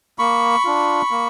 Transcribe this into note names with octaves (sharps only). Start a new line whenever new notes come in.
A#3 B5 C#6
D4 F4
A#3